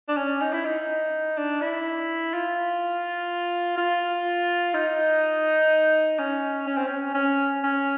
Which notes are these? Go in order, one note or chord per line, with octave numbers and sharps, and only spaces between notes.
D4
C#4
D#4
E4
D#4
D4
E4
F4
F4
D#4
C#4
C#4
C4
C#4
C#4
C#4